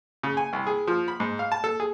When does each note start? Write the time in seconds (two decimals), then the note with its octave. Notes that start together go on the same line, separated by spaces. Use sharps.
0.23 C#3
0.37 G#5
0.53 C2
0.67 G#4
0.87 F3
1.08 B5
1.20 G#2
1.39 F5
1.52 A5
1.64 A4
1.80 G#4